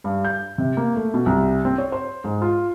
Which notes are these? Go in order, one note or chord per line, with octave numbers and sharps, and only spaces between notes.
G2
G6
C3
A#3
A3
B2
C2
C4
C#5
C5
G#2
F4